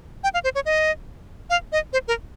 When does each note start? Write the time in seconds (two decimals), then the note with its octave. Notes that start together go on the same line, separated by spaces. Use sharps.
0.24 G5
0.34 F5
0.44 C5
0.55 C#5
0.66 D#5
1.50 F5
1.72 D#5
1.93 C5
2.08 A#4